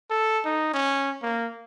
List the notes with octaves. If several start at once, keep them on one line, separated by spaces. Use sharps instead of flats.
A4
D#4
C#4
A#3